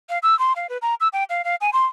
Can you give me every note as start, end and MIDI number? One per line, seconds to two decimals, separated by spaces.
0.10 0.18 77
0.23 0.37 88
0.39 0.53 84
0.56 0.67 77
0.69 0.78 71
0.82 0.95 82
1.01 1.08 88
1.13 1.24 79
1.30 1.42 77
1.45 1.55 77
1.61 1.70 80
1.73 1.86 84